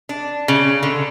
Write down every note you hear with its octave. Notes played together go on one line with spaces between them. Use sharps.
D4
C#3
D3